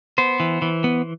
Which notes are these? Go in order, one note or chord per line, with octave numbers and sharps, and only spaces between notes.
B3 C5
E3
E3
B3